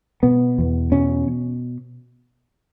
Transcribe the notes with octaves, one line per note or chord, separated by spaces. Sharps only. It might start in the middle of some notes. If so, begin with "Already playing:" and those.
B2 B3
E2
B2 C#4